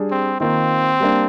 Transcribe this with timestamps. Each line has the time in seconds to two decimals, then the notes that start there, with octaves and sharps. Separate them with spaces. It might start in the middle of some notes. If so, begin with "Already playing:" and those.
Already playing: G3 D4 G#4 D5
0.11 C4
0.40 D#3 A#3 C4 F4
1.00 G3 A#3 D4